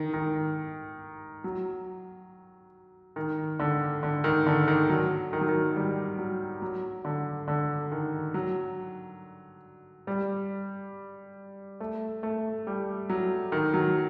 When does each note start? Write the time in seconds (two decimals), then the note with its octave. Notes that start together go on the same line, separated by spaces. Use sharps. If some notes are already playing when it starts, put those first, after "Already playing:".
Already playing: D#3
0.14 D#3
1.44 F#3
3.16 D#3
3.59 D3
4.03 D3
4.24 D#3
4.47 D3
4.68 D#3
4.89 F#3
5.33 D#3
5.41 F#3
5.49 D#3
5.76 G3
6.18 F#3
6.62 F#3
7.05 D3
7.48 D3
7.92 D#3
8.34 F#3
10.07 G3
11.80 A3
12.23 A3
12.67 G3
13.09 F#3
13.52 D#3
13.74 F#3